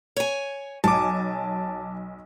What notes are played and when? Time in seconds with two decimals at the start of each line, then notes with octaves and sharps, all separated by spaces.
0.17 C#5 G#5
0.84 B1 F#3 G#5 A5 D6